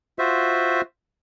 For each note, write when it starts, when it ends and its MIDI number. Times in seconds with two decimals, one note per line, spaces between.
0.19 0.81 65
0.19 0.81 66
0.19 0.81 72
0.19 0.81 76